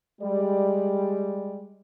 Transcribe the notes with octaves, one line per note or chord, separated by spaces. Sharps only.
G3 G#3 D5